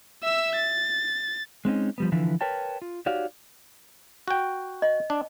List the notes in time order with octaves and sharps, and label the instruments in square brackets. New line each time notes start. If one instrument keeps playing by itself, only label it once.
[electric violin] E5 E6
A6
[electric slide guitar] G#3 C4 C#4 D#4
F3 G3 B3
D3 E3 F3 E4 B4
A#4 B4 C#5 G5 A5
F4
D#4 F#4 G4 C#5 D5 F5
[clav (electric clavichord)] F#4 G5
[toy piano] D#5
[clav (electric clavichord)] D4